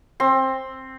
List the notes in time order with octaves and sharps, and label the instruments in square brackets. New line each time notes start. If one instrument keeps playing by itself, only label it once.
[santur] C4 C6